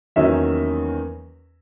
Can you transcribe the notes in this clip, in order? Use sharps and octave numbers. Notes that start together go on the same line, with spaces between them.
E2 D#3 F#3 A#3 C#4 E5